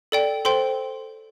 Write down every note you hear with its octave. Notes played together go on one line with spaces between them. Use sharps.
A4 D5 G5
A4 C5 G5 C6